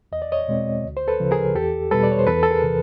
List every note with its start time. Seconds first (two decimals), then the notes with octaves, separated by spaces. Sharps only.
0.12 E2 D#5
0.22 D5
0.32 C#5 D#5
0.48 B2 G#3 C4
0.84 D2
0.97 C5
1.08 A4 B4
1.20 C#3 F3
1.31 G#4 A#4
1.55 E2 G4 A4
1.91 B2 G3 A4 B4
2.03 D5
2.12 C#5
2.19 C5
2.27 E2 A4 B4
2.43 A4
2.51 G#4 A#4
2.62 C3 E3